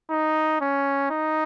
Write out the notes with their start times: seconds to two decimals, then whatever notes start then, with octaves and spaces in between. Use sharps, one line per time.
0.11 D#4
0.61 C#4
1.11 D#4